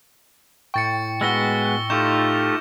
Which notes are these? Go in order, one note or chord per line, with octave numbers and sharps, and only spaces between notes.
A2 G5 C#6 A6 C#7
G#3 B3 F#4 E6 A#6 G7
A3 D#4 F4 G4 A4 C#6 G6 E7